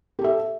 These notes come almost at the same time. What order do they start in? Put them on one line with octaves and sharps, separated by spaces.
G4 A4 E5